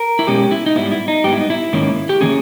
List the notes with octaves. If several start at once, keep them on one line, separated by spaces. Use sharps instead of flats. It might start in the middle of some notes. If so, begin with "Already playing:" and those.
Already playing: A#4
E4
B2 G#3 C#4 G4
E4
D#4
G#2 G3 B3 E4
E4
D#4
G#2 G3 B3 G4
E4
D#4
E4
G#2 D#3 A#3 C#4
G4
D#3 A#3 C#4 G#4